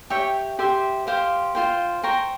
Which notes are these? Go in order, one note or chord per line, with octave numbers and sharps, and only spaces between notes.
G4 C#5 E5 G5
G4 C5 E5
G4 C5 F5 C6
F4 C5 G5
C5 G5 A#5 C#6